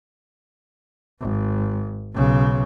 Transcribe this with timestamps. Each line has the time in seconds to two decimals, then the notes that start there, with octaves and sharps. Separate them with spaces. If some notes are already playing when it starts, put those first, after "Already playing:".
1.21 G#1
2.14 B1 C#3